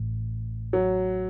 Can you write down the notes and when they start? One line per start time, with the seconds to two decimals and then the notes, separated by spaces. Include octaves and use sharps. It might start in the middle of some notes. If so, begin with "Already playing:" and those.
Already playing: A1 A2
0.73 F#3